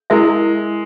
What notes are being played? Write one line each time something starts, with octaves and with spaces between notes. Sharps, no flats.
G#3 E4 A#4 E5